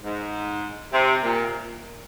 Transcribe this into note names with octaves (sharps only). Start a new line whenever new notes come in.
G#2
C3
A#2